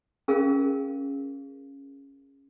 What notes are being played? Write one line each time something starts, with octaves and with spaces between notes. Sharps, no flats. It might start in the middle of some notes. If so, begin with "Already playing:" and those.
C#4 G#4 A#4 F5